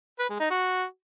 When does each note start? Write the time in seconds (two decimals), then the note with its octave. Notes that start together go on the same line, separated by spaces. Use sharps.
0.19 B4
0.30 G#3
0.40 D#4
0.50 F#4